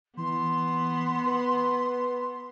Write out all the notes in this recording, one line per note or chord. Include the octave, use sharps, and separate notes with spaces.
E3 B3 C6
B4